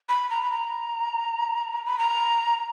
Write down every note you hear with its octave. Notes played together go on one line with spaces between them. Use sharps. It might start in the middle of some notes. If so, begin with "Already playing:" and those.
B5
A#5
B5
A#5
B5
A#5